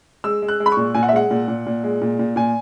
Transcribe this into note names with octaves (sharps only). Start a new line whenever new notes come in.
G#3 E6
G#3
F#6
G#3
B5
A#2 C#6
A#2 G#5
F#5
E5
G#3 F#5
A#2
A#2
A#2
G#3
A#2
A#2
A#2 G#5